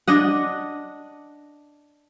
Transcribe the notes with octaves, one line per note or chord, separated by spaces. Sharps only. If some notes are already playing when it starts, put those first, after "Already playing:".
D4 D#5 F#5